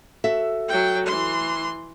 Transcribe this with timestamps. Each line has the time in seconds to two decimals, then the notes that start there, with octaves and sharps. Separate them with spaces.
0.24 F#4 A4 E5
0.69 F#3 G5
1.06 E3 C6